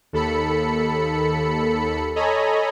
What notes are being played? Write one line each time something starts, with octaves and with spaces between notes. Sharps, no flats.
D#2 A4 B5 C#7
A4 C#5 D#5 G#5 A#5 B5